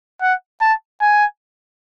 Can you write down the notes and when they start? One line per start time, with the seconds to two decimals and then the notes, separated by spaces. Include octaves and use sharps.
0.21 F#5
0.61 A5
1.01 G#5